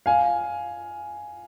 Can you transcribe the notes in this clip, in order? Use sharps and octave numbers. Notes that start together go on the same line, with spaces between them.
F5 G#5